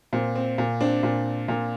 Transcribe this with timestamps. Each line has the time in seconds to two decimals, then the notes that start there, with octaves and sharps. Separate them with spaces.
0.13 A#2 C4
0.36 C4
0.58 A#2
0.81 C4 D4
1.03 A#2
1.48 A#2